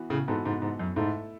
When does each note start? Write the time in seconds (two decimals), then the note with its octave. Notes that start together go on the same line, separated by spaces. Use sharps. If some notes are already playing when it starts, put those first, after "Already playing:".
Already playing: E3 B3 F#4
0.10 A2 C#3
0.28 G#2 E3 B3 F#4 A4
0.45 G#2
0.62 G#2
0.79 F#2
0.96 G#2 A3 E4 A4